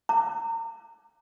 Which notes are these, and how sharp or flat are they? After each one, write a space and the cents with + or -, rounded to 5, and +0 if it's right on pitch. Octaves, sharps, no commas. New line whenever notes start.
A#5 -35